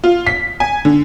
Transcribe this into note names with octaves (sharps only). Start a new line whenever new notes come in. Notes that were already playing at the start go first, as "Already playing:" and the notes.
F4
B6
G#5
D3